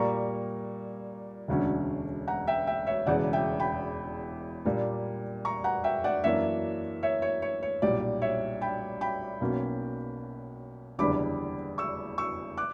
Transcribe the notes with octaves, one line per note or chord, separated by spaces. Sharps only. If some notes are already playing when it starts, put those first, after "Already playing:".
Already playing: A#2 G3 A#3 A#5 C#6
E1 D2 D3 F#3 C#4
F#5 A#5
E5 G5
E5 G5
C#5 E5
E1 E2 C#3 D5 F#5
E5 G5
G5 B5
A#2 G3 A#3 D4
A#5 C#6
F#5 A#5
E5 G5
D5 F#5
F#2 E3 A#3 D4 C#5 E5
C#5 E5
C#5
C#5
C#5
B1 A#2 G3 D5
C#5 E5
G5 B5
G5 B5
B1 B2 A#3 C#4
F#1 E2 D3 G3 B5 D6
C#6 E6
C#6 E6
D6 F#6